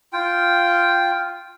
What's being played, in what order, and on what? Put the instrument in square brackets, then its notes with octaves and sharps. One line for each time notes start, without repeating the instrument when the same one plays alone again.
[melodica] F4 G5